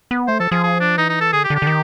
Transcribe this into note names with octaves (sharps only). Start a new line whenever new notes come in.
B3
A3 C5
F3 A4
F3 G#4
G#4
D4
E3 D#4
D#4
A4
D3 G#4
G4
D3
G4
D3
D#3